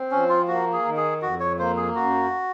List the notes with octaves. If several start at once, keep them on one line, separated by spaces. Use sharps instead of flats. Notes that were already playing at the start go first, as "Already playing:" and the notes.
Already playing: C4
F3 C#4
F4
A#3 F#4
G#4
D#3
G#4
F2 F#4
C#5
A#3 C5
G#4
F#2 F#4